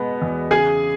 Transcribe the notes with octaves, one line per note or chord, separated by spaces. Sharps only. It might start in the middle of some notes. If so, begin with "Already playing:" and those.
Already playing: B2 G#3 B3
E2
C#3 G#4 G#5